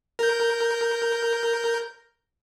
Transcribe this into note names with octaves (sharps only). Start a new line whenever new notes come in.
A#4 G6